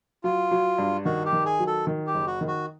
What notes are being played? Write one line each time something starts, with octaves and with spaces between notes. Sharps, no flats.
F#3 F4
F#3
G2
D#3 F#4
G4
D#3
G#4
F#3
A4
D#3
G4
F#1
F#4
D#3
F#4